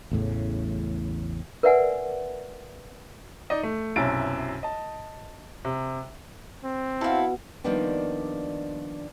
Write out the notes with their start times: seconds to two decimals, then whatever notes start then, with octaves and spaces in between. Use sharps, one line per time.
0.11 A1 E2 A2 C#3
1.63 A#4 B4 D5 E5 F#5 G#5
3.50 D#4 D5 D#5
3.63 A3
3.96 B1 F#2 C3 E4 A6 D7
4.63 D#5 A5
5.65 C3
6.64 C4
7.01 B2 E4 A4 F5
7.64 D#3 F3 G3 A#3 B3 D4